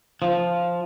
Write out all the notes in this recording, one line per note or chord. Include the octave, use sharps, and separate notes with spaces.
F3